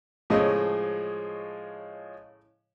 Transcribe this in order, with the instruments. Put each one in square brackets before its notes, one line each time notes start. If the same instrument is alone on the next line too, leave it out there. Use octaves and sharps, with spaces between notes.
[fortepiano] A2 C#3 D#5 [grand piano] F3 G#3 C#5